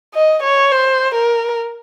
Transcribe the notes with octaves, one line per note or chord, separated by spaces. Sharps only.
D#5
C#5
C5
A#4